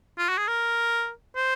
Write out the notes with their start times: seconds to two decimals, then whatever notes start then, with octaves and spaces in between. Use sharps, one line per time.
0.18 F4
0.29 F#4
0.38 G#4
0.48 A#4
1.36 C5